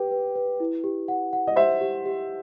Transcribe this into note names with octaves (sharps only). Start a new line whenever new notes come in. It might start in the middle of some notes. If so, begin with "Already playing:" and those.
Already playing: G4 B4 G5
B4
B4
E4
G4
F#5
F#5
D#5
G4 C5 E5
G4
G4